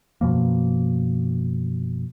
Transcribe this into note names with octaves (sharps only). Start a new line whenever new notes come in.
F#2 B2 F3 A#3